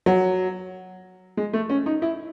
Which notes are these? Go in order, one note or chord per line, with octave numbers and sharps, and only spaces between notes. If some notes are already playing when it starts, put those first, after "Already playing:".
F#3
G#3
A3
C#4
D#4
E4